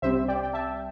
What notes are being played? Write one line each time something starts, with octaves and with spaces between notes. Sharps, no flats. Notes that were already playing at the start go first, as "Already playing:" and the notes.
C2 C3 G3 C4 C5 E5
D5 G5
G5
E5 A5